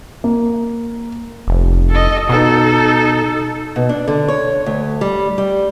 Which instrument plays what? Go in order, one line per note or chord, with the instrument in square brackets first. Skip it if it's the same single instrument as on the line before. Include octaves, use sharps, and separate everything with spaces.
[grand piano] A#3
[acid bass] F1
[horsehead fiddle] A4 D#5
[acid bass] B2 [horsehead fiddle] D#4 A4
[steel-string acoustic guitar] B2
D4
D3
C#5
D2
G3
G3